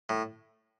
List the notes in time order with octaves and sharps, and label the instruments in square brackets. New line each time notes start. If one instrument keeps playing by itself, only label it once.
[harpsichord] A2